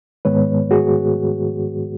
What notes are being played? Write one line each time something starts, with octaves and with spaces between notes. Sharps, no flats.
G#2 D#3 G#3 B3 B4 C#5
F#4 G#4